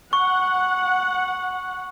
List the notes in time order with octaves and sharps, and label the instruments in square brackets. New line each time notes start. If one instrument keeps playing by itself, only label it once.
[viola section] F#5 [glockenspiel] C#6